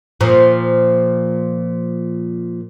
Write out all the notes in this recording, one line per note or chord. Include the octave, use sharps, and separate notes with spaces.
A#2 F3